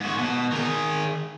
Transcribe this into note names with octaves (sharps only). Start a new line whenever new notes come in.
G#2 F#4
B2
D#3 G#4